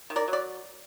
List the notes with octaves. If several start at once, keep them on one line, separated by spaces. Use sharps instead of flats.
D#3
A#4 D5
F#3
D5